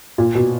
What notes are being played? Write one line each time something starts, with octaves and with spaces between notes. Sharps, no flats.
A#2
B2